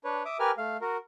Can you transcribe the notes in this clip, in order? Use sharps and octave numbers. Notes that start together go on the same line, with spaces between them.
D4 B4 C#5
E5 D6 D#6
G4 A#4 B4 G#5 F6
A3 F5
F#4 A#4